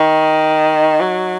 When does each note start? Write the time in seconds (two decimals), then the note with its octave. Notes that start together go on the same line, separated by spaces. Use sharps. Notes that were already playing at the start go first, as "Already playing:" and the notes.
Already playing: D#3
1.01 F#3